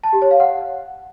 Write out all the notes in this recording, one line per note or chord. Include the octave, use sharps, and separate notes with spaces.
A5
G4
C#5
F5
F#5